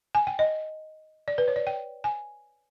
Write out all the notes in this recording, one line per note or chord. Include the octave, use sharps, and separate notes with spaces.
G#5
G5
D#5
D5
B4
C#5
D5
G5
G#5